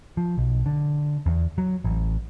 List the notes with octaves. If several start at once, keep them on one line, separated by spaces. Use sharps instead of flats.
F3
B1
D3
E2
F#3
A1